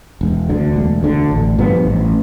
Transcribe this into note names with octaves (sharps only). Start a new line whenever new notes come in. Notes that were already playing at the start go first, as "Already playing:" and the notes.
E1
D2 D3
E1
D2 D3
A1
G2 F3 B3
A1